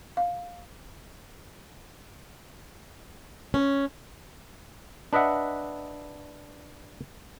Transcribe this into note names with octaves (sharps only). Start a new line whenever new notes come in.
F5
C#4
D4 B4 D#5 E5 F#5